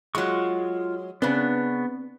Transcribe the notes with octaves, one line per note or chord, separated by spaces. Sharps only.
F#3 G#3 F4 C#6
C#3 B3 C4 D4 B4